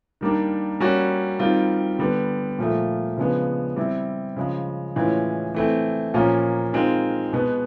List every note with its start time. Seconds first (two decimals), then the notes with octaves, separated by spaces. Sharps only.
0.21 D#3 G3 A#3 D4
0.80 G3 A#3 C#4 F#4
1.39 D#3 G3 C4 F4
1.99 D3 G3 B3
2.59 A#2 F3 A3
3.17 C#3 F3 G#3 B3 D4
3.76 G3 C4 E4
4.37 C#3 F3 G#3
4.96 A2 E3 G#3 C#4 F4
5.54 E3 A3 C4
6.14 A#2 F3 A#3 C#4 F4
6.73 D#3 G#3 C4 F4
7.33 B2 G#3 B3